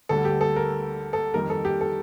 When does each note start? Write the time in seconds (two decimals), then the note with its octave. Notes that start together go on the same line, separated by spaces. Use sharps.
0.09 D2 D3 G3 A4
0.25 G4
0.41 A4
0.56 A#4
1.13 A4
1.34 F2 D#3 G3 A#4
1.50 A4
1.65 G4
1.81 A4